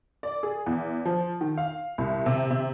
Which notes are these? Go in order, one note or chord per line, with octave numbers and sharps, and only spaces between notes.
D5
G#4
E2
F3
D#3
F5
C2
C3
C3